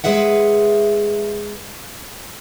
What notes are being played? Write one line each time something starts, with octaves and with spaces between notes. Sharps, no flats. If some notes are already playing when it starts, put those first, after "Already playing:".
G#3 G#4 B4 E5 F#5